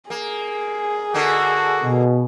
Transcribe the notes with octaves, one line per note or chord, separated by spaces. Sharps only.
A#3 G#4
D3 A#3 F#4
B2